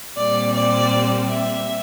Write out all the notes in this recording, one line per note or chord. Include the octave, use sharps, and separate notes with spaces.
A#2 G3 C4 D5
D5
E5